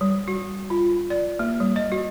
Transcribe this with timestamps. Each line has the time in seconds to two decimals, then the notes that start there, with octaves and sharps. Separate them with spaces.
0.01 G3
0.28 F#4
0.70 F4
1.10 D5
1.39 A#3
1.60 G3
1.76 D#5
1.92 F#4